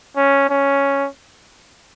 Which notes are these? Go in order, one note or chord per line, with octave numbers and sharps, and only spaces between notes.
C#4
C#4